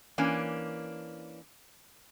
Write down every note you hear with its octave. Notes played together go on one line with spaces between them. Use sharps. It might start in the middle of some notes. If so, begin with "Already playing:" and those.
E3 A#3 C#4 D4